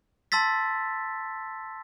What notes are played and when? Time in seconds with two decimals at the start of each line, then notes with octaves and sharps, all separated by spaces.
0.32 A5 C6 E6 A6 B6